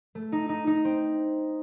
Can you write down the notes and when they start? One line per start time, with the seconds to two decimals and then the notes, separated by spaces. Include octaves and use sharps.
0.15 A3
0.32 D#4
0.49 D#4
0.67 D#4
0.85 C4